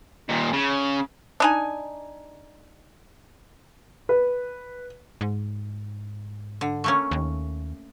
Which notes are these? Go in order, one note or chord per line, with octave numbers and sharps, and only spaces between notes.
D#2 A#2
C#3
D4 D#4 G#5
B4
G#2
D3
A3 A#3 C#4
D#2